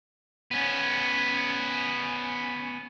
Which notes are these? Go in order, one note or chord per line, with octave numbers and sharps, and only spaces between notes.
B3 C#4